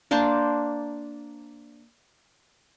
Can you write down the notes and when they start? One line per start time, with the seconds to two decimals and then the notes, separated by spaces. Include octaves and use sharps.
0.11 A#3 D4 C5 A5